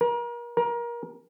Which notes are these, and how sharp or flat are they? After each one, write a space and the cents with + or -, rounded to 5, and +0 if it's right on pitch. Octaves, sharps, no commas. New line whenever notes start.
A#4 +35
A#4 +25